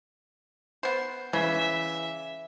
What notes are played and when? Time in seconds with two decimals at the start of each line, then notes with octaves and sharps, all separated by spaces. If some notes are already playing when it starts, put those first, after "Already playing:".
0.83 B3 C5
1.33 C#3 E3 E5